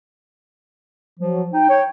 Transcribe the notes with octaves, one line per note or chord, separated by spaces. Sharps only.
F3 F#3
D#4 G5
C#5